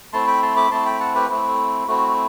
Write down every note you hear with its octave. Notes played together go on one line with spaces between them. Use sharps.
A3 C4 E4 A5 C6
G5 B5
A5 C6
B5 D6
A3 C4 E4 A5 C6
G5 B5
F#5 A5
G4 B4
A3 C4 E4
A3 C4 E4 F#4